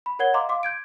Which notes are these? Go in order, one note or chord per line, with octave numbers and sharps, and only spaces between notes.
B5
A#4 C#5 F#5 G#6 G7
D#5 F5 A#5 C6 D6
F5 C6 D6
G6 G#6 D7